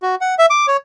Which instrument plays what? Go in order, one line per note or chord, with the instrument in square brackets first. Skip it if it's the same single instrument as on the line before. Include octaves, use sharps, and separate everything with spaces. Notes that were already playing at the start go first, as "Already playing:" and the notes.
[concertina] F#4
F#5
E5
D6
C#5